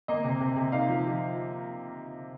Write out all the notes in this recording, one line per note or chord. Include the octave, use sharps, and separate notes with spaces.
A#3 D#5
C3
C3
C3
D#4 F5
F3
F3